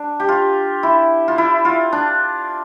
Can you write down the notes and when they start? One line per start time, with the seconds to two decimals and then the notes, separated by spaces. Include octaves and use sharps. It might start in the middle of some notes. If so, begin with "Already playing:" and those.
Already playing: D4
0.20 G4
0.29 F4
0.83 E4
1.28 F4
1.38 E4
1.65 F4
1.92 D4